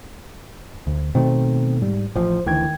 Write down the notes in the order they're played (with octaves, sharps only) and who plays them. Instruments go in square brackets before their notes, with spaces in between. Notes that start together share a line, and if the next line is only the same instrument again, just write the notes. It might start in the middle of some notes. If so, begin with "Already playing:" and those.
[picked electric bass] D2
[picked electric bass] B2 D#3 A3 [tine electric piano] C4
[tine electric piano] G#2 G3
[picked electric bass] A1 F3 [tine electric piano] C5
[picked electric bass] D2 E3 [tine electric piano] D#3 G5 G#6